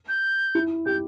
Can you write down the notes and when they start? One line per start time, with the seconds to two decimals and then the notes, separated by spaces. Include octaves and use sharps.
0.08 G6
0.55 E4
0.86 G4 G6